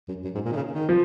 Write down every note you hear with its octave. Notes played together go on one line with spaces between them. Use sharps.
F#2
F#2
G#2
A#2
D#3
C#3
D#3
F3